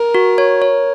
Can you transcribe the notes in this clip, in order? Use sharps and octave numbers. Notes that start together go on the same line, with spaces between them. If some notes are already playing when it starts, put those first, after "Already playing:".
Already playing: A#4
F#4
C#5
C#5